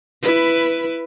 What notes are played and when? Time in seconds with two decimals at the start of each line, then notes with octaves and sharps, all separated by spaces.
0.22 E4 B4